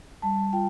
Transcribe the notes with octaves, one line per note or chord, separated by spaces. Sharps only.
G3 A5
F4 G5